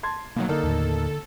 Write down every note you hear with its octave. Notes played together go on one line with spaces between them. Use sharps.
A5 C6 G#6
B2 D#3 F#3 A#3
D3 A#3 D#4 A4 A#4
D#2 A2